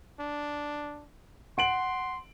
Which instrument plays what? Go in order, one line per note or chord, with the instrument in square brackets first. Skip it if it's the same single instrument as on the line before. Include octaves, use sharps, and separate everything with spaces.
[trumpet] D4
[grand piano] F#5 D7 F#7 [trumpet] C6